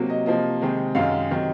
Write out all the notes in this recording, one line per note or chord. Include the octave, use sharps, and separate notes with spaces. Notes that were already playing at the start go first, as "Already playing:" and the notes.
Already playing: C3 F#3 A#3
D#5
C3 F3 A#3 D#5
C3 D#3 G#3
F#2 D#3 G#3 F5
C3 D#3 F#3